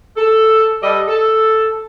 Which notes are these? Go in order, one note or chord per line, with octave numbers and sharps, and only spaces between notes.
A4
G3 A4 B4 D5 D#5
A4